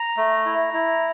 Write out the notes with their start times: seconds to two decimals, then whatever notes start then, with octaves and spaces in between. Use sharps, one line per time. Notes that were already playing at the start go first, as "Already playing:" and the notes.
Already playing: A#5
0.17 A3
0.46 E4
0.74 E4